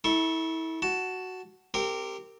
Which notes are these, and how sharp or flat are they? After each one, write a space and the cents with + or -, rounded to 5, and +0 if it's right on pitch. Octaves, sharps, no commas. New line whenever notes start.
E4 -30 A4 +0 C#6 -25
F#4 +5 A5 +0
C4 +0 G4 +0 A#4 -25